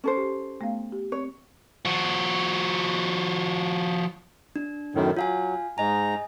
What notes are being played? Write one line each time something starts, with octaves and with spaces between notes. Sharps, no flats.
C#4 A4 C5
G4
A3 B3 F5
G4
C4 C#5
F3 F#4
D4
F#2 A2 D#3
F#3 F4 F5 G#5
G#2 D#5 G#5 A#5